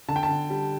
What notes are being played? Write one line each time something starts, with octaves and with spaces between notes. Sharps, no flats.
D3 A5
G5
A5
D3
G3